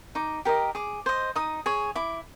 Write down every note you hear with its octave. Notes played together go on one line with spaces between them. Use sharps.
D#4 D6
G4 A#4 D#5
G#4 D6
C5 D#5
D#4 D#6
G#4 C#5
E4 D6